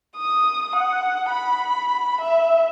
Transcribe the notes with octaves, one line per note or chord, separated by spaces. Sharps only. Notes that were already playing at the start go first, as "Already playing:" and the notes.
D#6
F#5
B5
E5